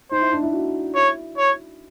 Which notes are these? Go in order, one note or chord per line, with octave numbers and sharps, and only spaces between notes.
D#4 C5
E4
D4
E4
F#4
E4 C#5
C#5